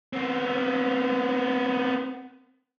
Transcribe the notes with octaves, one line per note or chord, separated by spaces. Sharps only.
B3 C4